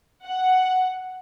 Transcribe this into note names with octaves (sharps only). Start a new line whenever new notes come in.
F#5